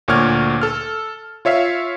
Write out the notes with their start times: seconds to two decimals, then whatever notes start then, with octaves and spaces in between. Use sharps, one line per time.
0.08 D2 A#2 C#5 C#6 F6 G#6
0.62 A4 F6
1.45 F4 C#5 E5 F5